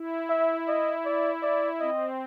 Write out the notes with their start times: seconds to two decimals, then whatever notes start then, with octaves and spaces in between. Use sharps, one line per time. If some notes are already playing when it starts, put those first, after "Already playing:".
Already playing: E4
0.29 E5
0.67 D#5
1.05 D5
1.43 D5
1.80 C4 D#5